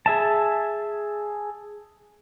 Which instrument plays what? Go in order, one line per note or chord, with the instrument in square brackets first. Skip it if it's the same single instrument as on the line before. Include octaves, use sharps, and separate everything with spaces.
[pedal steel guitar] G#4 E5 A5